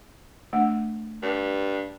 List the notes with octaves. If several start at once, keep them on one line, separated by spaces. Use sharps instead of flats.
A3 D4 F#5
G2